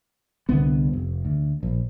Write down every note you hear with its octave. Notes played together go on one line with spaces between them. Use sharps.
C2 D3 B3
F1
D2
A#1